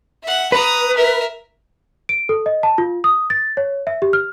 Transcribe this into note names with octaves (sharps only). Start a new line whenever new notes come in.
E5 F#5
B4 A#5 D#6
A#4 E5
D7
A4
D#5
A5
F4
D#6
A6
C#5
E5
G4
F6